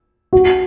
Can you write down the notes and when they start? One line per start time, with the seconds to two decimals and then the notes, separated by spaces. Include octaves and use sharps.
0.33 F#4